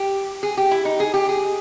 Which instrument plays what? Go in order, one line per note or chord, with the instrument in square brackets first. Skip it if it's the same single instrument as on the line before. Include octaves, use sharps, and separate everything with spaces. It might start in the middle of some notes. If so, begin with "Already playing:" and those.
Already playing: [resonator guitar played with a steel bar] G4
G#4
G4
E4
D#4
G#4
G4
G#4